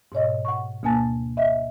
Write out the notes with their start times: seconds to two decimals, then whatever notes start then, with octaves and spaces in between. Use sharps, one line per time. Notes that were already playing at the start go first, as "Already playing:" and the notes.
0.12 G#2 B2 C#5 D#5
0.45 F#5 C#6
0.83 D2 B2 A#3 G#5 A5 A6
1.37 D#5 E5